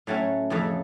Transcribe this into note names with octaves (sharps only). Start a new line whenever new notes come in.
A2 F#3 A3 C#4
F2 C#3 E3 A3